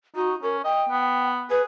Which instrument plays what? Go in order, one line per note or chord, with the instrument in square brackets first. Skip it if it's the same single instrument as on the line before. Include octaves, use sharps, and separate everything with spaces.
[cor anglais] D#4 [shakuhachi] F#4
[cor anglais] C#4 [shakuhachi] A#4
[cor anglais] D#5 [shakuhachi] G5
[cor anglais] B3
[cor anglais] G#4 [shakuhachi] B4